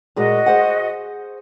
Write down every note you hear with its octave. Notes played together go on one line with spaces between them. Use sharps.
A#2 G#3 F#4 D#5
G#4 C5 F#5